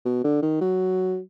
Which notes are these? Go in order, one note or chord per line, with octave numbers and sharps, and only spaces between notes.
B2
D3
D#3
F#3